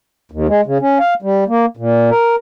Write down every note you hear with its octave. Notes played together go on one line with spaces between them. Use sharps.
D#2
G#3
C#3
C#4
F5
G3
A#3
A#2
A#4